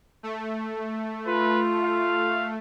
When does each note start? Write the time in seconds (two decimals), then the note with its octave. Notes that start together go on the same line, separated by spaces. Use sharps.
0.23 A3
1.27 F4 B4
1.84 F5